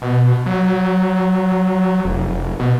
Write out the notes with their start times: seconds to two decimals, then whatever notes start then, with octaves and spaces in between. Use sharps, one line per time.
0.02 B2
0.46 F#3
2.05 F1
2.60 B2